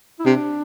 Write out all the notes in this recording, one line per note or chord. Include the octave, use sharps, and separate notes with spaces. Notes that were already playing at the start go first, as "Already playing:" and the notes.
E4
C3 D4